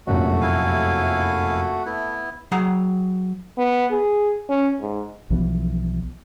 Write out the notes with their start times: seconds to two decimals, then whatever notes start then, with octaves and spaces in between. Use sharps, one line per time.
0.07 F1 A#1 F#2 A3 F#4
0.41 E4 F5 G#5
1.86 A3 B3 E4
2.52 F#3 G#4 F#5 A#5
3.58 B3
3.91 G#4
4.49 C#4
4.81 G#2
5.30 B1 E3 F3 B3